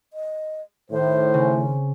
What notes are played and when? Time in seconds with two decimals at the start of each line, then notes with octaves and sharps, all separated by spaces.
0.13 D#5
0.90 A2 D#3 C5
1.34 C#3 C4